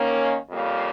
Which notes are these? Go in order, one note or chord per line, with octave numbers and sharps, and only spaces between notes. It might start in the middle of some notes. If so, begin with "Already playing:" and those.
Already playing: D#3 A#3 C#4
F2 C#3 G3 A#3